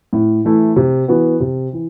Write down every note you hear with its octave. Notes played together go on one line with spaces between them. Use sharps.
A2
E3 A3 E4
C3
E3 B3 F#4
C3
E3